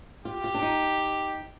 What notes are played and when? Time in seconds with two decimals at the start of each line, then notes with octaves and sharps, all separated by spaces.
0.25 F4 G4
0.44 F4
0.54 D4
0.62 D#4